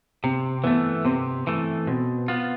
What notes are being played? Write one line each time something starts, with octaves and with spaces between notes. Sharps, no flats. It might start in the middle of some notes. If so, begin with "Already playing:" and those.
C3 C4
E3 A3 B3
C3 C4
E3 A3
B2 C4
B3 F4